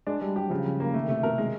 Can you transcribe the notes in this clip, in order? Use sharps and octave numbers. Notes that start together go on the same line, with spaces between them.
G#3 D4
G3 D4
F#3 G4
C#3 F3
C#3
A#3
D#3 A3
C3 A3
B2 A#4
G#3